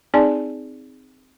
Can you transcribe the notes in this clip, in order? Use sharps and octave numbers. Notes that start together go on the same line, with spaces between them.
C4 D#4 G#4 D5 G#5 A5